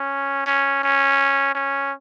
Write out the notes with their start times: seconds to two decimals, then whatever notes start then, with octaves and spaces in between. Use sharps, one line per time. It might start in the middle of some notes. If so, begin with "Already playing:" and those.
Already playing: C#4
0.46 C#4
0.83 C#4
1.55 C#4